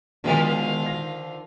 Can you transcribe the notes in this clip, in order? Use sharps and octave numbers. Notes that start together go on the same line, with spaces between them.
B2 D3 D#3 F3 G#3 F4 F5
A#6